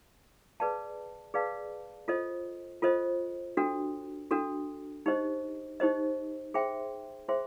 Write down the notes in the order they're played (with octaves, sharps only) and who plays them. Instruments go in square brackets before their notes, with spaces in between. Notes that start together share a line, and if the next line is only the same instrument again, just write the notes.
[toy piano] G#4 B4 D5 F5 A5
G#4 B4 D5 F5 A5
F4 A4 C5 D#5
F4 A4 C5 D#5
D4 F#4 A4
D4 F#4 A4
D#4 G4 C5 D#5
D#4 G4 C5 D#5
G#4 C5 E5 G5 C6
G#4 C5 E5 G5 C6